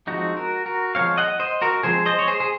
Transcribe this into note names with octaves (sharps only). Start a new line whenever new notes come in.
F3 G#3 C4 D#4 F#4
F#4 A#4
F#4 A#4
F3 G#3 C4 C#5 F5
D#5 F#5
C5 D#5
F#4 A#4
F3 G#3 C4 G#4 C5
C5 D#5
C#5
G#4 C5
G#4